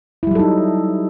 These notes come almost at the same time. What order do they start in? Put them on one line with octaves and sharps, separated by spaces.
E4 G3 F#3 A4 D#4